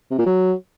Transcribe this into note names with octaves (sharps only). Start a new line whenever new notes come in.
C3
A#2
F#3